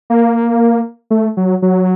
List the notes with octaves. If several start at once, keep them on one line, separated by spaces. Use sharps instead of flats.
A#3
A3
F#3
F#3